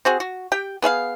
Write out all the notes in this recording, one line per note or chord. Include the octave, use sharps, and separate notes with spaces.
C4 F#4 G#4
F#4
G4 G5
B3 G#4 E5 F5